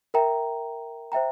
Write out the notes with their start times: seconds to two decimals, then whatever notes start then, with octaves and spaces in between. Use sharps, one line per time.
0.14 A#4 E5 G5 A#5
1.12 C5 E5 G5 A#5